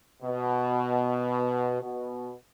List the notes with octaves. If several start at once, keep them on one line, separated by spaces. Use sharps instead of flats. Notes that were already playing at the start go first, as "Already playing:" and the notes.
B2
B2